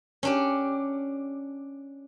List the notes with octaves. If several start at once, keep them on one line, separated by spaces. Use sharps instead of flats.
C#4 D4 G4